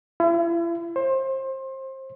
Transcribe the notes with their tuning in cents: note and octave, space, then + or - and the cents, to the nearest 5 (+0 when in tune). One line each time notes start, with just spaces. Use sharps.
E4 +40
C5 +25